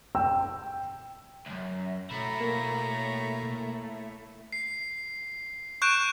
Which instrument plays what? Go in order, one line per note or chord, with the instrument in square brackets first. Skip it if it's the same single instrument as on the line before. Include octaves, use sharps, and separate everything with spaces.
[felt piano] G5 E6
[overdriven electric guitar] C2 F#2
[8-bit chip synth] B2 [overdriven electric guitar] A3 E4 [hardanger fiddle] C#5 A#5
[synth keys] A#3
[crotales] C7
C#6 F#6 G6 D7 E7